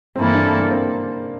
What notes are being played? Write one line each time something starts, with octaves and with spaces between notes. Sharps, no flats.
G2 E3 A#3 C4 E4 A4
D4
C4
A#3
C4